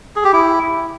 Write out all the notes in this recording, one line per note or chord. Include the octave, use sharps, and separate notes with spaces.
G#4
G4
E4